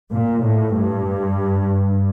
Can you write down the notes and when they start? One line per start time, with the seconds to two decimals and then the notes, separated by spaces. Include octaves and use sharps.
0.12 A#2
0.44 A2
0.76 G2